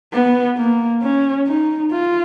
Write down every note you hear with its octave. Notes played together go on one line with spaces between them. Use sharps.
B3
A#3
C#4
D#4
F4